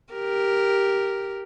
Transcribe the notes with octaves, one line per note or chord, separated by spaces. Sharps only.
G4 A#4